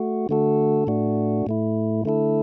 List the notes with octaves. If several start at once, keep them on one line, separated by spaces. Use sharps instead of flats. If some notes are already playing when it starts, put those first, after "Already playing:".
Already playing: A3 F#4
D3 A3 F#4 A4
A2 A3 D4 F#4
A2 A3 E4
D3 A3 E4 A4